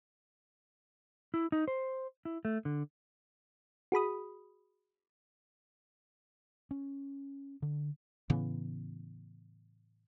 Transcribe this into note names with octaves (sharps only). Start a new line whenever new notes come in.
E4
D#4
C5
E4
A3
D3
F#4 G#4 B5 D#6
C#4
D3
A2 C#3 E3 B3